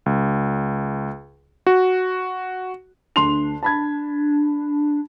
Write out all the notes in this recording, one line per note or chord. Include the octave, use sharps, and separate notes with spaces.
C#2
F#4
D2 D4 C6 F7
A5 B5 G#6